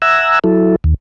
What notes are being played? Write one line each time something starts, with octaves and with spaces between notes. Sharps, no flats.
E5 F#5 G#5 A#5 E6
F#3 E4 A4
D#2